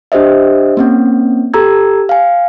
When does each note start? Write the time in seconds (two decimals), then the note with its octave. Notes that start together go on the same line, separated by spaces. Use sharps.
0.12 D4 G4 C5 D#5 E5
0.77 A#3 C4 C#4
1.54 G4 A4 A#5 E6 G#6
2.09 F5 G#5